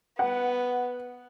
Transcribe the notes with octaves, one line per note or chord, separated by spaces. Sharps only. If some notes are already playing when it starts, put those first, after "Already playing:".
B3 F#5